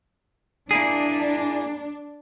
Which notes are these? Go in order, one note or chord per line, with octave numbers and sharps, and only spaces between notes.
A#3 D4 E4 G#4